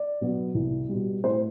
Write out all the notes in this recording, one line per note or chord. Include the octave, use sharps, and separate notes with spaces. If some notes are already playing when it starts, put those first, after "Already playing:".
Already playing: D5
B2 F#3 B3
C2
B2 G3
A2 C5